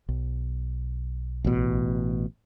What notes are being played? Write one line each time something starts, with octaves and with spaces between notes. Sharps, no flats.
B1
A1 B2